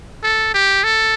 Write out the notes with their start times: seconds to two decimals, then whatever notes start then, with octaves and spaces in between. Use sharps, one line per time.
0.23 A4
0.54 G4
0.84 A4